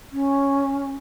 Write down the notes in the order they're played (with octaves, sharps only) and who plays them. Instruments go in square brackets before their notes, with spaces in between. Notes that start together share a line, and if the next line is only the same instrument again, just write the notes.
[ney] C#4